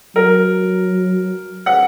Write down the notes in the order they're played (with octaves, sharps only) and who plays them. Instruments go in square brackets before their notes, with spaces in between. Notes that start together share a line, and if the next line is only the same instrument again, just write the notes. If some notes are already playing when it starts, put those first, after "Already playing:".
[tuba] F#3 [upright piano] A#4
[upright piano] F#5